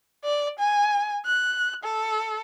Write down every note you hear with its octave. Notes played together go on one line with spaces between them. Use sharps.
D5
G#5
F#6
A4